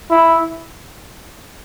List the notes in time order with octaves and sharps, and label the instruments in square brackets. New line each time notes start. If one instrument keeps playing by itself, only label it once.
[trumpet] E4